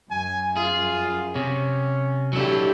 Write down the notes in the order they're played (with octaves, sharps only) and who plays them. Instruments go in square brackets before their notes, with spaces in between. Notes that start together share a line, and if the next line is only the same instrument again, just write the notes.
[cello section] F#2 [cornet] G#5
[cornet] F4 [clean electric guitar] G#4
[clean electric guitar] C3 [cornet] C#4
[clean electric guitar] F#3 A4 [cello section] D4 E4 G4